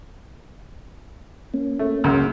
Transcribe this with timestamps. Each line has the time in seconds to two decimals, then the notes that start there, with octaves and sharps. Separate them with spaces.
1.54 A#3 C#4
1.79 A3
2.04 C#2 F#2